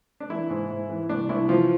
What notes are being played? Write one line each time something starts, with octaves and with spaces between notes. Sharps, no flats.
D4
E3 E4
G#2
G#2
E3
C2 D4
C2 E4
E3 F3 F4